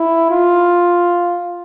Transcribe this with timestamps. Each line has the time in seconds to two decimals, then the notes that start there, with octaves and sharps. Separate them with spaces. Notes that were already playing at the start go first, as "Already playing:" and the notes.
Already playing: E4
0.31 F4